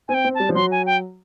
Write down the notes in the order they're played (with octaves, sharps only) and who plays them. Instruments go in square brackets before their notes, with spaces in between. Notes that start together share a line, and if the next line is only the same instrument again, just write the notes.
[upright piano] C4 [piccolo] G#5
[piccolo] G5
[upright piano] C4
[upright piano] G3 [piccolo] A5
[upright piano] F3
[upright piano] F#3 [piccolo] C6
[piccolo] G#5
G5